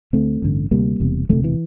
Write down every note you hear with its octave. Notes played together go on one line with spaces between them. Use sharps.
D2 D3 A3 C4
A1 G2 D3
D2 C3 G3 A#3
E1 E2 C3
E1 D2 C3 F3 A3
E3